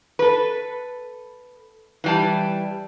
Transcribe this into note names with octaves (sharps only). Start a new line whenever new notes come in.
A4 B4
E3 G3 A5